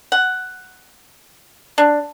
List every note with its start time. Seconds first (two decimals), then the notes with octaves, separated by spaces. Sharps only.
0.12 F#5
1.78 D4